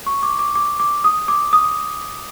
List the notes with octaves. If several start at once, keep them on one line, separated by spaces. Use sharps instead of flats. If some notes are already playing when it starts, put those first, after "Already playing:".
C#6
D6
D6
D6
D6
D#6
D6
D#6